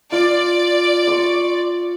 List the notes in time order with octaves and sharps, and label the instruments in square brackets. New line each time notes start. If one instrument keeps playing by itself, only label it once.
[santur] F4 [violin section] D5
[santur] C6 C#6